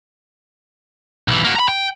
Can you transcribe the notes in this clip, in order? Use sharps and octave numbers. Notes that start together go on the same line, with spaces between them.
B1 E3
A#3 F#4
A#5 B5
G5